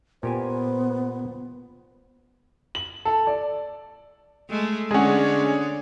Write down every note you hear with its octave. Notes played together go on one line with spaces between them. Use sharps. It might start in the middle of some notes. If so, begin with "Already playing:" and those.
A#2 B3 G4 C5 G#5
F#7
A4
D5
G#3 A3
D3 G#3 C#4 G#4 C#5 D5 F#5